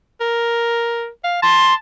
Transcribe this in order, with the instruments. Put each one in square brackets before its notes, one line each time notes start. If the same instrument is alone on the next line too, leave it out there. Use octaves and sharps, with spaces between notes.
[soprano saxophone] A#4
F5
[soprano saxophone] A5 [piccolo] C6